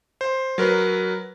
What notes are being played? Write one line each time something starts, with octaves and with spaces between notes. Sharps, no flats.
C5
F#3 A#4 B4